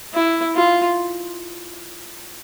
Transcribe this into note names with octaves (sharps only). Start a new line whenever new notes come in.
E4
F4